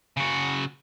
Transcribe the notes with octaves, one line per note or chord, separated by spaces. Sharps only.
C#3 F#4